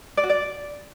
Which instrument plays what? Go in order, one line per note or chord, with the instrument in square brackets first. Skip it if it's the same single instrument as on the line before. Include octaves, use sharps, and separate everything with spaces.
[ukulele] D5
F#4
D5